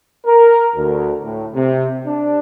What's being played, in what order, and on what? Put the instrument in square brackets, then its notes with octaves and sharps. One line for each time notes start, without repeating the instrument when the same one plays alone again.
[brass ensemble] A#4
D2
A2
C3
D4